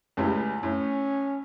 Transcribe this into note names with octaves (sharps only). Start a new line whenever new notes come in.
C#2 A2 G3
A2 C#4